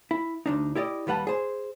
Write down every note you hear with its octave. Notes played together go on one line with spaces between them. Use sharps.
E4
D2 D4 D#4
E4 G4 D5 D#5
D#2 G3 B4 F#5 A5
G#4 C5